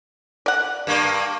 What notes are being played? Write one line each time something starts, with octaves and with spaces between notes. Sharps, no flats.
D5 F#5
G2 A#3